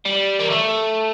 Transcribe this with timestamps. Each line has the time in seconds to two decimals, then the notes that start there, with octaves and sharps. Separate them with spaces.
0.06 G3
0.39 A#3
0.50 A3